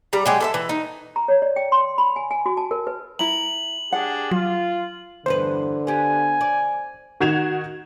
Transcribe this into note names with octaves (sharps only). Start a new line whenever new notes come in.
G3 A#5
F#3 G#3 G4
A4 B4 E5
E3
D#4
A#5
C#5
D5
G5
C6
B5
G#5
G#5
F#4
A5
A#4
B4
E4 A#5 F#7
D4 G4 G#4 F#5
F#3 F4
E2 G2 D3 B4 C5
B3 G4 G#5
D5
D#3 F#4 G#6 E7 F7